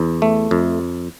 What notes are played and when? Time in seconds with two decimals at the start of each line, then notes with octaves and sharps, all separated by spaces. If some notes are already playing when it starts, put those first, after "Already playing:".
Already playing: E2
0.22 A3
0.51 F2